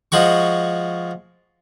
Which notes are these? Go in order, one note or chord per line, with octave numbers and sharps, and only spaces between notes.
F3 G#3 F#4 C#6